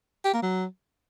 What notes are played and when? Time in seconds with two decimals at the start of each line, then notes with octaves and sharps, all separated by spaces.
0.25 G4
0.34 A#3
0.43 F#3